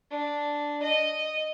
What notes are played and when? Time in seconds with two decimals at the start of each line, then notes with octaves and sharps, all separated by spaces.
0.11 D4
0.82 D#5